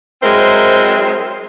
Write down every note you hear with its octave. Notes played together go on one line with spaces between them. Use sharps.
F#3 G#3 C4 E4 A#4 C5